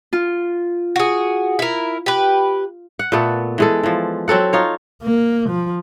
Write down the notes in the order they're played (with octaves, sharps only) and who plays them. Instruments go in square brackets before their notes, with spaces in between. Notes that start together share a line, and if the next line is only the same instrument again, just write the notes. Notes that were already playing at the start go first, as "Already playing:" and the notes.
[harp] F4
[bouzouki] F#4 G#4
E4 A#4
G4 B4
[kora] F#5
A#2 A3 B3 A4
E3 G#3 A4
E3 F3
F#3 C4 A4 F#5
D#4 F4 C#5
[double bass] A#3
F3